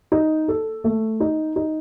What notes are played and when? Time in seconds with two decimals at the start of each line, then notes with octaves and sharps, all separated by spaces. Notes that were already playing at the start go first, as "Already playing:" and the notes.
0.12 D#4
0.48 A4
0.84 A3
1.20 D#4
1.56 D#4